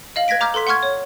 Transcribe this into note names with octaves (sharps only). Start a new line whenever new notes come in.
D#5 F5 F#7
B4 G#6 A#6 B6 D7
A#5 D6 F6 G6
A4 B4 C6 B6
F#5 C6 C#6 F6 G#6
C#5